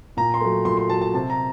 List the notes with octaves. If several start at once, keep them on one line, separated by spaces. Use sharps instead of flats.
A#2 A#5
C6
F#3 A3
A#2 C6
C6
F#3 A3 A5
A5
C3 A5
A#5